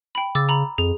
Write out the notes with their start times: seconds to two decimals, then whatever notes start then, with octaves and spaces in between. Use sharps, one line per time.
0.15 G5 B5
0.35 C#3 D6 E6 A6
0.49 A#5 B5
0.78 F2 G#4